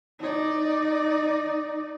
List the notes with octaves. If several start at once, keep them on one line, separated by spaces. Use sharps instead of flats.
D#4 D5